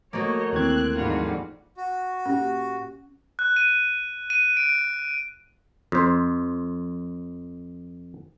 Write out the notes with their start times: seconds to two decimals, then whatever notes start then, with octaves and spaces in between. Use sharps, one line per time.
0.13 A3 A#3 F#4 C#5 D#5
0.53 D#2 E3 C4 F#6 G#6
0.97 F2 G#2 D3 G3 F4 F#4
1.77 F#4
2.26 A#2 C#4 G4
3.39 F#6
3.56 D#7
4.30 D#7
4.57 D7
5.92 F2 C5